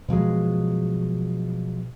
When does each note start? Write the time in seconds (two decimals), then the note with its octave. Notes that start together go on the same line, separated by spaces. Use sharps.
0.09 B2 F3 F#3 G#3